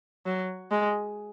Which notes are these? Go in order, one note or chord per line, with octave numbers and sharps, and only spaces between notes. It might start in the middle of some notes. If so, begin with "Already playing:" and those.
F#3
G#3